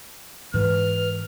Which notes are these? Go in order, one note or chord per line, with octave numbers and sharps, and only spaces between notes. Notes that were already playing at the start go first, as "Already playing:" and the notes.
G#2 E3 B4 F6